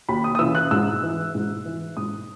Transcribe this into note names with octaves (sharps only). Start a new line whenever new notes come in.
D#2 B5
D#6
D#6
C#3 E3 E6
F#6
G#2 E6
E3
G#2
E3
G#2 D#6